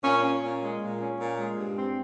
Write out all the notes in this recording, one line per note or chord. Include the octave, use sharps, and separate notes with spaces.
A#2 C#4
C#4
A#2
G#3
A#2
C#4
A#2
G#3
G2
C4